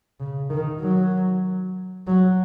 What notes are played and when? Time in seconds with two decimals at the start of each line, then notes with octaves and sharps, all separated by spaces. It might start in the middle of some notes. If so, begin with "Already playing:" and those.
0.20 C#3
0.50 D#3
0.81 F#3
2.07 F#3